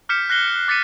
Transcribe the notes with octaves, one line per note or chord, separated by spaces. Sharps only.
D6 F6 G6 B6 C#7 E7
F#6 A#6 C7 G7
C#7
D6 A6 B6 C#7 D#7